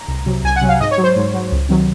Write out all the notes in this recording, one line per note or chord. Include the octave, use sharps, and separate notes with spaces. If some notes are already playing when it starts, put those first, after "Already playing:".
Already playing: A#5
C2
C3 F#3
C2 G#5
F#5
C3 F#3
F5
G#2 D#5
C#5
F#3
C5
G#2
F#3
C#2
C3 D#3 F#3